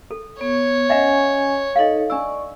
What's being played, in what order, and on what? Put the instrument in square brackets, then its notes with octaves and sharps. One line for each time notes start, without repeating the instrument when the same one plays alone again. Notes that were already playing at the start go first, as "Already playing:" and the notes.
[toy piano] A4
[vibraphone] B3 [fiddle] C#5
[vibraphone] C#4 G#5 [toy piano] D#5 E5 F#5
[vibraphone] D#4 A4 C#5 [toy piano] D#5 F5
[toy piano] D4 E6 [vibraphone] D5 C#6